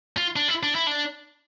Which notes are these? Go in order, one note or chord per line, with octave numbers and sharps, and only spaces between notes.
F4
D4
E4
D4
E4
D4